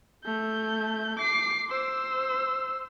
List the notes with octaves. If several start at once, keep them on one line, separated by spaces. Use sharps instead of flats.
A3 G6
D6 C7
C5 E6